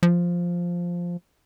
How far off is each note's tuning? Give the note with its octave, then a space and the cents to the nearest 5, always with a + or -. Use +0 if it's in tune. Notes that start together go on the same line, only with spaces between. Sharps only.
F3 +0